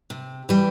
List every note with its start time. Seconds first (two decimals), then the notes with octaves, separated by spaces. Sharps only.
0.10 C3
0.49 E3 G3